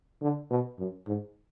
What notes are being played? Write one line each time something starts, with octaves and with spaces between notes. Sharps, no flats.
D3
B2
F#2
G#2